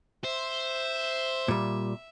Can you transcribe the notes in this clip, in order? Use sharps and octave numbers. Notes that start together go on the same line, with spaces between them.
C5 E5
A#2 G3